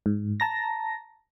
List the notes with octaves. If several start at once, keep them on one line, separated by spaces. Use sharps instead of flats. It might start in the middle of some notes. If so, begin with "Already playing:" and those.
G#2
A5 A#5 A#6